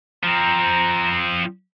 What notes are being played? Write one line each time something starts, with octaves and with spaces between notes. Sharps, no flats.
F3 C4 A#5